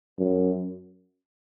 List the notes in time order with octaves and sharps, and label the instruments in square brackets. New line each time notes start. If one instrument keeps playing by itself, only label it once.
[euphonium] F#2